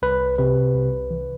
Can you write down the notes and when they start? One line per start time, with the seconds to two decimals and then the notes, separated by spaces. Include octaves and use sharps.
0.02 C2 B4
0.38 C3 B4
0.75 C2
1.11 E3